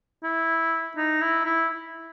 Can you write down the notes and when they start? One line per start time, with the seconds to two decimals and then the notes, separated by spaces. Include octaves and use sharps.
0.23 E4
0.96 D#4
1.21 E4
1.45 E4